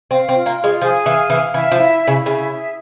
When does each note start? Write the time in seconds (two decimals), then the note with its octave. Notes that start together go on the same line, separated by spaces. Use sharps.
0.10 C4 F5
0.29 C4
0.34 F4
0.46 A#3
0.58 F4
0.64 G#3
0.81 F3 G#4
1.06 E3 F5
1.30 E3 F5
1.54 E3 E5
1.71 F3
1.78 E4
2.02 E4
2.07 C#3
2.26 C#3 E5
2.49 G#4